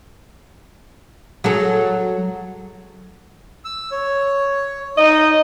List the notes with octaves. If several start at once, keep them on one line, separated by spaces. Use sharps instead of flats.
F#3 G#4 A4
E6
C#5
D#4 D#5